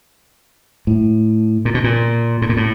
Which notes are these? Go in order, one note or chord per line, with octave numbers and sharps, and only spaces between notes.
A2
A#2
B2
A#2
A2
A#2
A2